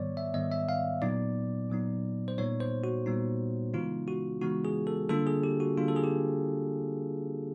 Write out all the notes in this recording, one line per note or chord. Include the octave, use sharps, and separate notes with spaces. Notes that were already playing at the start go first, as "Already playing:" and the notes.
Already playing: G#2 D#3 G3 B3 C#5 D5
E5
G#2 D#3 G3 B3 D#5
E5
F5
A#2 F#3 B3 D#4 D5
A#2 F#3 B3 D#4
C5
A#2 G3 B3 D#4 C#5
C5
F#4
A#2 G3 B3 D#4
C#3 E3 G#3 B3 D#4 F4
F#4
C#3 E3 G#3 B3 D#4 F#4
G#4
A4
D3 G3 A#3 D4 F4 A4
G#4
G4
F#4
D3 G3 A#3 D4 F4
A4
G#4
G4